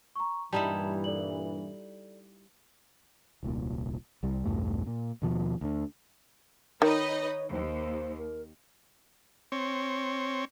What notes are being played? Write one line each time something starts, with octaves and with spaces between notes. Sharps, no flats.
A#5 C#6
G2 A#2 E3 G3 D#4 E4 A5 E7
A4 D5 F#7
D#1 C2 A#2
C2 G3
B1 E2 G2 A3
A#2
D#2 B2 F3
D2 D3
D#3 D#4 B4 C#5 D#5
D#2 C5
A#4
C4 C#5